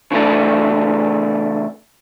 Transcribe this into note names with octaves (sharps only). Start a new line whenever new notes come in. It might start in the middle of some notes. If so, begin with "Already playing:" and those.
C#3 E3 A3 D4